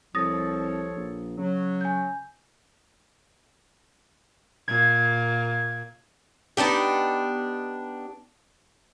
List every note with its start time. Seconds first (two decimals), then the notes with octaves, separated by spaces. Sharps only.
0.15 C2 F3 A4 C#5 D#6 A6 A#6
0.97 A#1
1.38 C#3 F#3
1.81 G#5 G6
4.68 A#2 G#6
6.57 B3 D4 D#4 G4